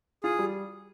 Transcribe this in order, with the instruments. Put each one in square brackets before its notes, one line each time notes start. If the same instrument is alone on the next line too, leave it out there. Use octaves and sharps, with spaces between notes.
[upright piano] F4 [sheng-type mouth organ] G#4
[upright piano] G3